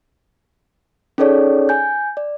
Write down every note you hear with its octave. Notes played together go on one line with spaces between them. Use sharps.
C#4 D#4 G#4 A4 C#5 D5
G#5 G6
D5